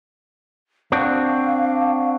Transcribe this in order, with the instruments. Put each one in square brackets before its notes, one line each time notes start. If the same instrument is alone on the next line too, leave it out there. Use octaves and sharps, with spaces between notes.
[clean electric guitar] C4 D4 F#4 [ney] F5